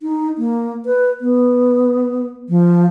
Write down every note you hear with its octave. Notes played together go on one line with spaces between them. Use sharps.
D#4
A#3
B4
B3
F3